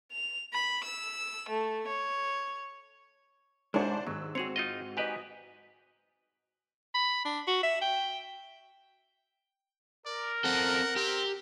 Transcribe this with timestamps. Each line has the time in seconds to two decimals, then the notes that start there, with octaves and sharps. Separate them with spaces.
0.12 F7
0.53 B5
0.84 E6
1.49 A3
1.87 C#5
3.74 C2 G#2 G#3 D4 F#4 C5 C#5
4.07 D#2 G#2 F#3 E6
4.35 C4 F#4 G#4 C#5
4.56 D#4 F4 D#5
4.97 G#2 G4 B4 D#5 G#5
6.94 B5
7.25 D4
7.47 F#4
7.63 E5
7.81 G5
10.05 A#4 D5
10.44 C4 A4 F#5
10.96 C4 G4